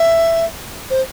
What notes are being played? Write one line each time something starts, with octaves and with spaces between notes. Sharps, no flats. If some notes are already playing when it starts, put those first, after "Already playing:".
Already playing: E5
C5